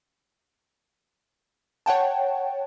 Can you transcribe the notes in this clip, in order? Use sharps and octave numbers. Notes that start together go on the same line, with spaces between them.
C#5 F#5 G5 A5